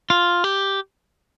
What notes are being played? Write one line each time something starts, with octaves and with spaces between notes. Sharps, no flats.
F4
G4